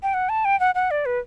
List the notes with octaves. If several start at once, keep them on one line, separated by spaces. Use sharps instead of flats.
G5
F#5
A5
G5
F#5
F#5
D5
B4